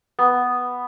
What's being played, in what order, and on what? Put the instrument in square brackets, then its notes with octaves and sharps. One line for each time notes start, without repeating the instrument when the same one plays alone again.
[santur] B3